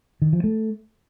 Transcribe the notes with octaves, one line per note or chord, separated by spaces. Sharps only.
D#3
F3
A3